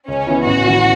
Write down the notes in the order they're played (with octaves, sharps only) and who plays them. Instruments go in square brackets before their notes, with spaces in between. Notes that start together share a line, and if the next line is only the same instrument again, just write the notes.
[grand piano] C#2 [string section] C#4
[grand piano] C#3 E3 B3 E4
[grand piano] A1 [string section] F#4
[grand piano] A2 E3 C#4